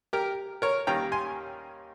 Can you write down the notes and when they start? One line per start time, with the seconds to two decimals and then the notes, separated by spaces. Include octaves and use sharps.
0.13 G4 A#4
0.62 A#4 C#5
0.87 D#2 D#3 G3 A#3 C#4 G5 A#5
1.12 G#5 C6